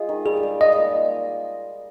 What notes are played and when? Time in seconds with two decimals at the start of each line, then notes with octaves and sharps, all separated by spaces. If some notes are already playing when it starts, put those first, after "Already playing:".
Already playing: G#3 F4
0.09 D#3
0.25 G3 G#4
0.43 G3
0.61 F4 D#5
0.78 A#2